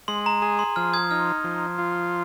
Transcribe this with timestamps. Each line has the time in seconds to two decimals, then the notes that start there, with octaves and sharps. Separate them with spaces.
0.08 G#3 C6
0.26 A#5
0.42 G#4 A#5
0.59 C6
0.76 F3 F6
0.93 D#6 G#6
1.11 D#4 F6
1.27 A#5
1.44 F3
1.78 F4